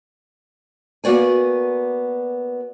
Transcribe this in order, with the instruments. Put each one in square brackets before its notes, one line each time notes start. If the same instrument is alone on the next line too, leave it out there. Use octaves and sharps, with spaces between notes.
[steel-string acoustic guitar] A#3 B3 F#4 D5 G#5